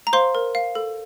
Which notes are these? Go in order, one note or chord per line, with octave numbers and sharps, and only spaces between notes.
A#5
C5 F5 C6
A#4
F5
A4